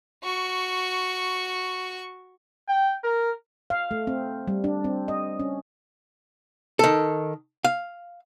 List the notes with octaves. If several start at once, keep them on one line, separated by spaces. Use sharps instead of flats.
F#4 C#6
G5
A#4
F5
A3
C4
G3
D4
C4
D#5
C#4
D#3 A4
F5